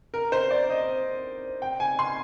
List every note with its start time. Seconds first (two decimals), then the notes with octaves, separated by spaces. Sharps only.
0.14 A#4
0.32 C5
0.51 D5
0.70 D#5
1.62 G5
1.80 G#5
1.99 C6